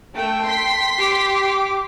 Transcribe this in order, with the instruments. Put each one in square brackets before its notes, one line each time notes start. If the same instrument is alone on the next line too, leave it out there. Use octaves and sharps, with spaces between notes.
[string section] A3 [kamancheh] G5
[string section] C6 B6
[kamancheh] G4 D6